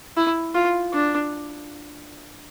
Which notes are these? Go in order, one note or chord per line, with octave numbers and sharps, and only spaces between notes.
E4
F4
D4